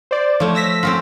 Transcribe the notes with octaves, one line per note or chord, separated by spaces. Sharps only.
C5 D5
F3 A3 C#5
E6 A#6 B6
C4 C#4 F4